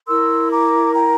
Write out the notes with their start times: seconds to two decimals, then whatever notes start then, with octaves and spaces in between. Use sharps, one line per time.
0.06 E4 A#4 C6 E6
0.51 A#5 D6
0.95 G5 A#5